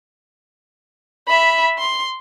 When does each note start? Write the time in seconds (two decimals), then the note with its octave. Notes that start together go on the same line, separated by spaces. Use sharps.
1.28 E5 B5
1.79 C6